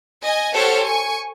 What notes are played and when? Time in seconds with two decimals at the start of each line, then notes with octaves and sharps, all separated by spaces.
0.23 D#5 G#5
0.53 G4 A4 C5 C#5 F#5 F6
0.82 G#5 C#6